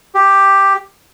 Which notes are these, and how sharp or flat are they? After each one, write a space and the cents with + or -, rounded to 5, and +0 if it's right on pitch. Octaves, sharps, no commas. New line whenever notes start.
G4 +5